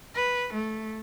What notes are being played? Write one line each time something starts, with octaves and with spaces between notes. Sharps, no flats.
B4
A3